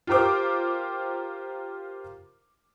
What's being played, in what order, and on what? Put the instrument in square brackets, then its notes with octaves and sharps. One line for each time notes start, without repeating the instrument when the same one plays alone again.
[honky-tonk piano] F4 G4 A#4 C5 D6